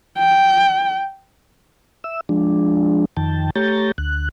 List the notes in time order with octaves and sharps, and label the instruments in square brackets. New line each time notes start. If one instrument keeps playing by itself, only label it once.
[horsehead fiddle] G5
[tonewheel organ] E5 E6
F3 G#3 D4
F2 D#3 G5 A5
A3 G4 C#5 A#5 G6 A6
D2 F#6